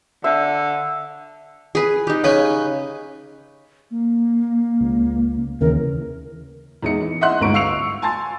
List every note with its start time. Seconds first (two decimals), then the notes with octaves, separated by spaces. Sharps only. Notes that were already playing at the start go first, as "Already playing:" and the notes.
0.24 D3 E5
1.75 G#4 B4
2.07 D#4 G4
2.24 C#3 C#4 B4 G#5
3.91 A#3
4.81 C#2
5.61 D#2 C#3 E3 A#4
6.83 E2 G#3 D#4 E4 C#7
7.01 E3
7.21 D#5 E5 F#5 C6 F#6
7.40 G1 D2 G#2 C#6 D7
7.54 F5 C#6 E6 C7 C#7 F7
8.02 G#5 A5 C6 A6